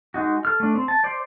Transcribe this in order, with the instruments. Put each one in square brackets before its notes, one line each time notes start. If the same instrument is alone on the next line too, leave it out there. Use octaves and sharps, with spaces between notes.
[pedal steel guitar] G#3 D#4 F#4
A4 F6
A3 D4
C4
A5
C5 D5